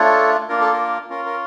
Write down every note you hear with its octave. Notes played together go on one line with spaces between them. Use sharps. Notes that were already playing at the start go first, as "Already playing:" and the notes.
Already playing: A3 D4 F4 A4 C#5
A#3 D4 F4 A#4
A4
A#4
C#4 F4 A#4
A#4